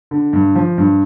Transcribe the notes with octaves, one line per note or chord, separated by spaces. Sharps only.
D3
G2
F3
G2